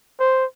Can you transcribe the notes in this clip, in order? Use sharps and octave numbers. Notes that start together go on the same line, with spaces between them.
C5